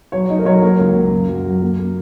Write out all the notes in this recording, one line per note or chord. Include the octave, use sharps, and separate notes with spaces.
F#3 C#5
D#4 D#5
A#4
F#3 C#5
A#3 A#4
C#2
A#3
F#2
F#2
F#3
A#3
A#3